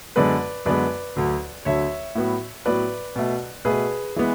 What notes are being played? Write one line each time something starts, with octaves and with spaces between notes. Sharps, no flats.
F#2 D3 G#3 B3 B4 D5
F#2 D3 G#3 B3 B4 D5
D2 D3 F#3
D2 D3 F#3 C#5 E5
A2 F#3 B3
A2 F#3 B3 B4 D5
B2 A3
B2 A3 G#4 B4
E3 G#3 B3